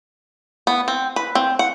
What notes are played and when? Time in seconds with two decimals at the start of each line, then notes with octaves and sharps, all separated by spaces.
0.67 B3
0.88 C4
1.16 B4
1.35 C4
1.59 F#5